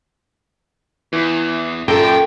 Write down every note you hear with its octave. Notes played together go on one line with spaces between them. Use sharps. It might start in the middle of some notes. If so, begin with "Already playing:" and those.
E2 E3
F#2 A#2 A4 A#4 G5